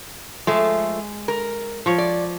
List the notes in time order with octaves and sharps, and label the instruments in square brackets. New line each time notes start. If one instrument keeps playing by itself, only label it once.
[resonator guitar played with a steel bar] F3 A3 [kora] G#3
[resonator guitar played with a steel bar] A#4
[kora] F3 C#5
[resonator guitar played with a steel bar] D5